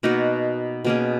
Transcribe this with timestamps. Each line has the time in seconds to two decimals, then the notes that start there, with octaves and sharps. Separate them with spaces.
0.03 B2 A#3 D#4 F#4
0.84 B2 A#3 C#4 G#4